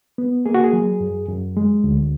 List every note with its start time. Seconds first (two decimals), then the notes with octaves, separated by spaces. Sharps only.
0.18 B3
0.46 A#3 G#4
0.54 F#4
0.64 G#4
0.73 F#3
1.00 F#2
1.28 F#2
1.57 G#3
1.84 D2